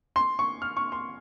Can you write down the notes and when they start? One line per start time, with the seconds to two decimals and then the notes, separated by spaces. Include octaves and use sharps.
0.16 C6
0.39 C#6
0.62 F6
0.77 C#6
0.92 C6